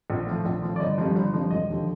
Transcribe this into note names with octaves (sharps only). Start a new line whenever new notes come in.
A#1
A2 F3
A#1
A2 F3
D5
G1 D#5
G2 D3 F3
G1
G2 D3 F3
E1 D#5
D#2 D3 F3